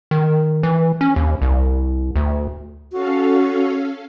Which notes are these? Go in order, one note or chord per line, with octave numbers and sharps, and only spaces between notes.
D#3
E3
C#4
D#2
C2
D2
C#4 F#4 A4 F5